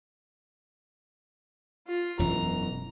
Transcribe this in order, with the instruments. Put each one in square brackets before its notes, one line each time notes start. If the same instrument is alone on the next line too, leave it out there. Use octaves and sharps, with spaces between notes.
[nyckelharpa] F4
[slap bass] E1 F#2 E3 [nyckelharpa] A#5